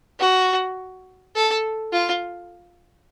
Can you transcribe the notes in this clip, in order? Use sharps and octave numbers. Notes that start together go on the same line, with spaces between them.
F#4
A4
F4